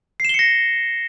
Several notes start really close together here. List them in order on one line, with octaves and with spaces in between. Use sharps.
C7 E7 G7 C#7 A#6